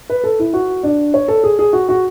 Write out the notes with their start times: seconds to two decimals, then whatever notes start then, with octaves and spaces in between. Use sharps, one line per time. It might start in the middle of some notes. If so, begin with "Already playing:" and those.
0.10 B4
0.24 A4
0.39 E4
0.54 F#4
0.83 D4
1.14 C#5
1.28 A4
1.44 G#4
1.59 G#4
1.73 F#4
1.89 F#4